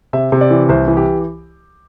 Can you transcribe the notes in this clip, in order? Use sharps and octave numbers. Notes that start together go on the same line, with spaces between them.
C3 E5
C3
D5
E3
C2 C5
E3
G4